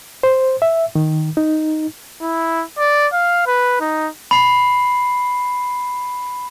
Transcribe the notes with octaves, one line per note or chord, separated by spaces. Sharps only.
C5
E5
D#3
D#4
E4
D5
F5
B4
D#4
B5 C7